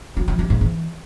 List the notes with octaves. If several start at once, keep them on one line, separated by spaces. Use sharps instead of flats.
F#3
F3
G3
G#2
E3